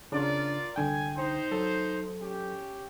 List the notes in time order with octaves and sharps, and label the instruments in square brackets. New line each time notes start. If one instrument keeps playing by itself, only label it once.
[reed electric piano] C#3 D4 [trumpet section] F4 A#4 D5
[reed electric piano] C2 D3 G5 [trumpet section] G#5
[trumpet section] D#4 C5
[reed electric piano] F#3 A4
[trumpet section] C#4 G4